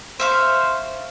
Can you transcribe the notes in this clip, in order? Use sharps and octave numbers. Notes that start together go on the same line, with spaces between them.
C5 E5 F5 C#6